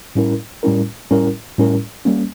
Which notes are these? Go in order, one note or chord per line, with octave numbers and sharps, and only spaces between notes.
A2 G3 C#4 E4 A#4
A2 G3 C#4 E4 A#4
A2 G3 C#4 E4 A#4
A2 G3 C#4 E4 A#4
G3 A#3 C#4